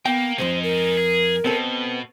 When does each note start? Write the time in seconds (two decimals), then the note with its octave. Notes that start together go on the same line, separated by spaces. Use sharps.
0.06 A#3 B3 G5
0.38 C2 F2 G#3 D#4 C5
0.63 A#4
0.97 G#4
1.45 B2 B3 C4 A4